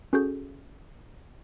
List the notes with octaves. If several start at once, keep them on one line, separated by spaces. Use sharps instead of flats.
C#4 F#4 G#4 A4 C#6 G6